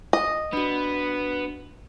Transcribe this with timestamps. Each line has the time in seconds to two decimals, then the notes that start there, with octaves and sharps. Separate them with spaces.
0.13 D#5
0.53 B3 D4 F#4